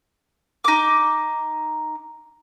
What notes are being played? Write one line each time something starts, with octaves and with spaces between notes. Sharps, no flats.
D#4 D6